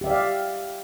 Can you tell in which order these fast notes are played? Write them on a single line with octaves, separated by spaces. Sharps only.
G4 E5 D5 F5